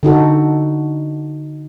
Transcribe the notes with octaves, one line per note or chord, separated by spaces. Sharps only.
D3 D#4 F#4 A4